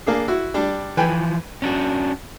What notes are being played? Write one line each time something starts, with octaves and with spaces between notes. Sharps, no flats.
A#3 D4 G#4
E4 F#4
G3 D4
E3 F3 B4 G5 G#5
C#4 D4 F#4